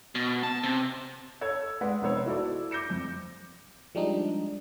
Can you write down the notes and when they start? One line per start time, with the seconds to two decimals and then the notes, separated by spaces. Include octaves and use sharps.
0.15 B2
0.43 A5
0.63 C3
1.41 A4 C#5 E6 G#6
1.81 G#3 B4 D5 F#5
2.02 F1 B3 C5 C#5 E6
2.26 E4 F#4 A4 D5
2.71 D6 G6 A#6 C#7 E7
2.90 F2
3.95 F3 G3 G#3 D4 D#4